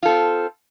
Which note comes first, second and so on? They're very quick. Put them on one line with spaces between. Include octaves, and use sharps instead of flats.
F4 A4 C4